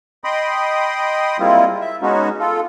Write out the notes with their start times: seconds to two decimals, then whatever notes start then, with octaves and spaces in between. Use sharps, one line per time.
0.24 D#5 G5 B5 C6 D#6
1.40 G3 G#3 A#3 C4 E4 F4
1.81 E5
2.02 G#3 B3 C#4 D#4 F#4
2.40 F4 A4